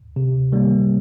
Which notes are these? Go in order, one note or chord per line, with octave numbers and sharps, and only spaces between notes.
C3
D#3 G3 A#3